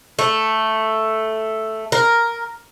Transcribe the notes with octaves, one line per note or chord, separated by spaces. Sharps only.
A3
A#4